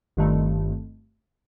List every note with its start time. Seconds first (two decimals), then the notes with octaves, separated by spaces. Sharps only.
0.17 G1 G2 D#3 A3 C4